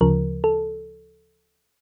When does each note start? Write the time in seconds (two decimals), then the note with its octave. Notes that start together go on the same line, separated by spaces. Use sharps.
0.01 D2 C#3 F3 A#4
0.44 A4